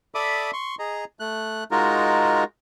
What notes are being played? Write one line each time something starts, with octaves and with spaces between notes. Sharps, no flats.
A4 D5 E5 B5 D6 D#6
C6 C#6
G#4 D#5 A#5
A3 F#6
G#3 D#4 F4 F#4 A#4